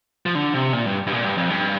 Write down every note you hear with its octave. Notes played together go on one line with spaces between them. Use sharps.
F3
D3
C3
A#2
G2
G2
A#2
G2
F2
G2